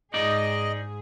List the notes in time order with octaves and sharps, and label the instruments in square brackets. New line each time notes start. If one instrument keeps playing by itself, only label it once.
[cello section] G#2 G#4 [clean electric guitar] D#4 D5 [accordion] D#5